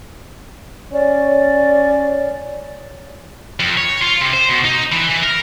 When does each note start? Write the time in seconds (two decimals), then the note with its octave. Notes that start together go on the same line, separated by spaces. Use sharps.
0.93 C#4 D5
3.60 F2
3.77 C#5
4.01 F4
4.22 C3
4.33 C5
4.49 B2
4.65 D#4
4.92 E3
5.10 E3
5.24 A#4